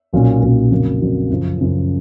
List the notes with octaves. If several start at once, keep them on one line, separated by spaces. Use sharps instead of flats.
B1 A#2 F#3 A#3 C#4
B1 A#2 F#3 A#3 C#4
F2 C#3 F#3 A#3
F2 C#3 F#3 A#3
F#2 C#3 F3
F#2 C#3 F3